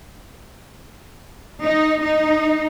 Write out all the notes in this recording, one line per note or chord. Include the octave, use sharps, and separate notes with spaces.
D#4
D#4